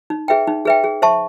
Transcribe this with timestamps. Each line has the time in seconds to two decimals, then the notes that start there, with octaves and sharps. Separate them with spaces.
0.10 D#4
0.28 G#4 B4 E5 G5
0.47 D#4
0.65 G#4 B4 E5 G5
0.84 G#4
1.02 C5 E5 A5 C#6